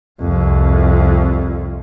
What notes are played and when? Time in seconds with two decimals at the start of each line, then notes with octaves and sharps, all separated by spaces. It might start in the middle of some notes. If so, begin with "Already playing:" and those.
0.21 C2 F2